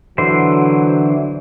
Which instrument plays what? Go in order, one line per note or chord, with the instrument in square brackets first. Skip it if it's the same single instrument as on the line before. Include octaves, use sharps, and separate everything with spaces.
[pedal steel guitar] D3 E3 C5 [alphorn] F#3